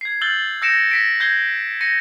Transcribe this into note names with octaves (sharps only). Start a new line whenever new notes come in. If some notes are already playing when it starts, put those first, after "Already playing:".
G#6 C7
E6 F6 G6 A6 F#7 G7
E6 G6 A#6 C#7 D7 E7
A#6 B6 D7
G6 G#6 A#6 C7 G7
A#6 C#7 D#7